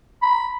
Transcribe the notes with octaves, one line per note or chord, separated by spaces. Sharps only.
B5